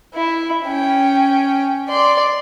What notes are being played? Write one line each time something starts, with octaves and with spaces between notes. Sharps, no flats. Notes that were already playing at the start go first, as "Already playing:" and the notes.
E4
C#4 G5
D5 C6